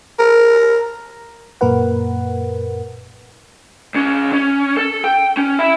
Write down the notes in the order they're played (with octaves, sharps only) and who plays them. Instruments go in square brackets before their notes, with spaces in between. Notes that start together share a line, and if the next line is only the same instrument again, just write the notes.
[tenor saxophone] A#4
[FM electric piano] F#2 A#2 A#3 A#4 B4 F#5
[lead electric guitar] C#2 C#4
C#4
A4
G5
C#4
E5 B5